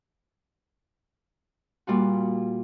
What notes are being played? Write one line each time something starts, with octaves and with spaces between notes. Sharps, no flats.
A#2 G3 F4 F#4